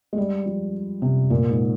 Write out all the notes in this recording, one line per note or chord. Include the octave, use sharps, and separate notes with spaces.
G#3
G3
F3
C3
A#2
G#2